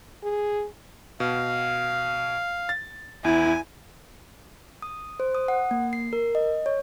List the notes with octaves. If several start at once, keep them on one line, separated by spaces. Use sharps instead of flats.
G#4
B2 F5
A6
E2 E4 G#5
D#6
C5
D#6
F#5
A#3
C7
A#4
D#5
C#5